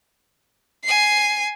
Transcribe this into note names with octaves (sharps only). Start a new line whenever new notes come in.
G#5 C7